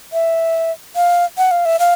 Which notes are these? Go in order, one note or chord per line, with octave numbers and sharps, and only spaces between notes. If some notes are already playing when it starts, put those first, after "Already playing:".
E5
F5
F#5
F5
E5
F5